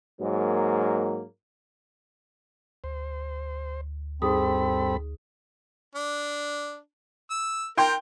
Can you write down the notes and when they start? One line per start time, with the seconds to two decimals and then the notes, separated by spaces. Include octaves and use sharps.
0.21 G#2 F#3 A#3
2.84 D2 C5
4.22 G2 C4 D#4 G#4 A4 B5 D#6
5.95 D4
7.30 E6
7.78 A#4 G5 C6 G6